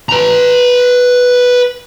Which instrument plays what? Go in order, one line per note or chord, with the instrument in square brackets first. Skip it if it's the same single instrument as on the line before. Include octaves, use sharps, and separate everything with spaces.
[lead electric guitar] B4 A#5